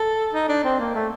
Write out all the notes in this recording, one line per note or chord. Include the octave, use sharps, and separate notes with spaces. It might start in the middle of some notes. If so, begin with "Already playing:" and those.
Already playing: A4
D#4
D4
C4
A#3
A3